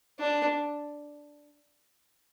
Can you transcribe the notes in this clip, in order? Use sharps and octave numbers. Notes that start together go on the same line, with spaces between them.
D4